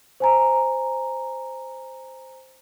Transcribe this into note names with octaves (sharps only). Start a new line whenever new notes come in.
C5 G#5 A#5